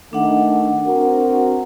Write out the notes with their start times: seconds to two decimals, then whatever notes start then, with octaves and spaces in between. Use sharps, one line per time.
0.13 D#3 A3 D4 F#5
0.86 C4 F#4 A#4